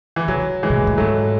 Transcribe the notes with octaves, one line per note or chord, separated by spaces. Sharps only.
E3
D3 F#3
E3 G#3
B2
A2
A2
G#2 F#3 A3